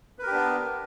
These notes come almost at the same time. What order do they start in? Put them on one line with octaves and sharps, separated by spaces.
B4 A#4 G4 D4 B3